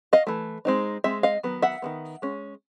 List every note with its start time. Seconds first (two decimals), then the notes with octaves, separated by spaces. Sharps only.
0.13 D#5 F5
0.27 E3 A3
0.65 G#3 C4 D#4
1.04 G#3 C4 E5
1.23 D#5 F5
1.43 D#3 F#3 B3
1.62 E5 F#5
1.82 D#3 F#3 B3
2.22 G#3 C#4